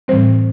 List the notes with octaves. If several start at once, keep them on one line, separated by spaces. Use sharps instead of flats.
A2 E3 G3 C4 C5